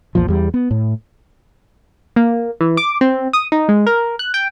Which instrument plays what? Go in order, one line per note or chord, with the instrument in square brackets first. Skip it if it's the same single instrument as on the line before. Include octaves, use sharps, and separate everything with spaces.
[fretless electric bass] A#1 E2 A#2 F3
E2 G3
B3
A2
[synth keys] A#3
E3
D6
C4
D#6
D#4
G#3
A#4
F#6
G5